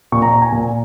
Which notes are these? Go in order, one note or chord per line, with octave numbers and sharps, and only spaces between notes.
A#2 C#6
A#5
A#5
G#5
A#2